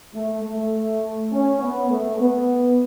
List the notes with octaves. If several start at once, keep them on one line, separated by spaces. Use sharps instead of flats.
A3
A3
C#4
B3
A3
B3